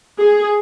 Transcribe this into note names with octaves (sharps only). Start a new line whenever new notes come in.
G#4